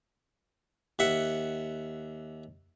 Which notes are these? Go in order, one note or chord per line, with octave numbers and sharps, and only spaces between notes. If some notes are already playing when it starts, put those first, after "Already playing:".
D#2 E5 F#5